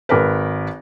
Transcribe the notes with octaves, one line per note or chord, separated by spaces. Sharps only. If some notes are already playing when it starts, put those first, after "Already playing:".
G#1 A#4 B4